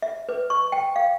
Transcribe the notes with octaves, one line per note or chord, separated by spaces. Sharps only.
E5
B4
C#6
G5
F5